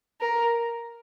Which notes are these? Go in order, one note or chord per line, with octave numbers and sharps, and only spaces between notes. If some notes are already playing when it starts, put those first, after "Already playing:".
A#4